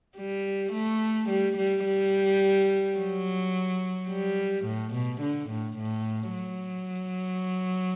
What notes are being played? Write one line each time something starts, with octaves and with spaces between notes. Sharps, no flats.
G3
A3
G3
G3
G3
F#3
G3
A2
B2
D3
A2
A2
F#3